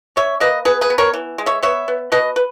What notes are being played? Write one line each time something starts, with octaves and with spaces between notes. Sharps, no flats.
C#4 C#5 E5
A#3 B4 D#5
B3 G#4 B4
G#4 B4
B3
A#4 C#5
E3
G#3
C#5 E5
B3 C#5 E5
B3
B2 B4 D#5
B4